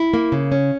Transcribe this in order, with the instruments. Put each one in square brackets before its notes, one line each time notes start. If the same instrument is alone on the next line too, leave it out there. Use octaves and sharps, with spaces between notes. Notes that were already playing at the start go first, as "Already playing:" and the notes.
Already playing: [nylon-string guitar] E4
A#3
C#3
C#4